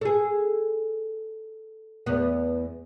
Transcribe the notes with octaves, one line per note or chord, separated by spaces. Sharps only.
G#4 A4
E2 B3